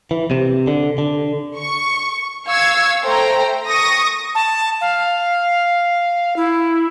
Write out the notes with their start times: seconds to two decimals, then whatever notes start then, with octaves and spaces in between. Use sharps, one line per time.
0.11 E3
0.31 C3
0.67 D3
0.98 D3
1.57 C#6
2.47 F5 C#6 E6 G#6
3.04 A3 C5 G5 A#5
3.66 C#6 D#6 A#6
4.35 A5
4.81 F5
6.36 E4